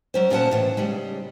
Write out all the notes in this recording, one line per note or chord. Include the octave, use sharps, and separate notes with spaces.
F#3 C#4 C5
D2 A#2 C#4 C5 F#5 A5
A2 C#3 E3
C#3 G3 G#3